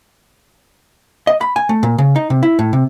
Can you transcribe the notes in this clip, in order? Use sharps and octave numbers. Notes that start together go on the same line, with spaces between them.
D#5
B5
G#5
A3
A#2
C#3
D#4
C3
E4
A2
C3